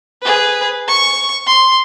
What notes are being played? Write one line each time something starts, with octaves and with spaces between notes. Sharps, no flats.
G#4 B4
C#6
C6